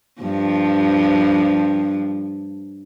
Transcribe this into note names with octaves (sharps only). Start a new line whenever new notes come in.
G2 F3